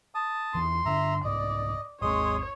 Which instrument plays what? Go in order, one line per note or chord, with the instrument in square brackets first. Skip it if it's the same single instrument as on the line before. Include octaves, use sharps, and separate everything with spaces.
[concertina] A5 D#6
[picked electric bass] E2 E3 [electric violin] C6
[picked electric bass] G2 D3 D4 [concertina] E5 A#5
[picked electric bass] C2 G#2 B3 [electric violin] D5 [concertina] D#5
[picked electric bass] G#1 D#2 C4 [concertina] G#3 C6 D#6 [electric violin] C#5